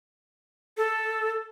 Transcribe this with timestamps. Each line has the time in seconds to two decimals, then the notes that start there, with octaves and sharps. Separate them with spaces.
0.77 A4